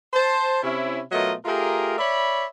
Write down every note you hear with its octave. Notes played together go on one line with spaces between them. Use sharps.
C5 A5
C3 C#4 E4
B2 F#3 A3 F4 A#4 D#5
A3 F4 G4 G#4 A#4
C#5 D5 E5 B5